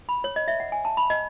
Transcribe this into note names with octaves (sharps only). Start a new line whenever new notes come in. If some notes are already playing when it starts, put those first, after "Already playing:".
B5
C#5
D#5
E5
F#5
G#5
A5
B5
D#5